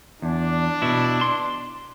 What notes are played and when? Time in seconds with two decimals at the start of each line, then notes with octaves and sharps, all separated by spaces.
0.22 E2 D4
0.82 B2 E4
1.21 C6